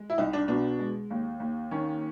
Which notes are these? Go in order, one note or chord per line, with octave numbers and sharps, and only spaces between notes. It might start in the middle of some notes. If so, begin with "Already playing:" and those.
Already playing: G#3
E4
C2 D#4
D4
B2 D4
G#3
D#2
D#2
D#3 C#4